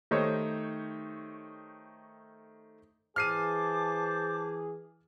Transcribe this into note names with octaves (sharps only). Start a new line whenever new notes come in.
D#3 A3 D#4 G4 C5 C#5
E3 G#4 C5 A5 D6 F6 C7 D#7